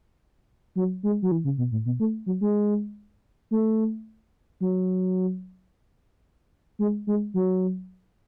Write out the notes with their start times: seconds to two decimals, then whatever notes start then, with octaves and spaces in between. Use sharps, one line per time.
0.76 F#3
1.03 G#3
1.22 F#3
1.31 E3
1.44 C#3
1.58 B2
1.72 A2
1.85 B2
2.00 A3
2.26 F#3
2.41 G#3
3.51 A3
4.61 F#3
6.79 G#3
7.07 G#3
7.34 F#3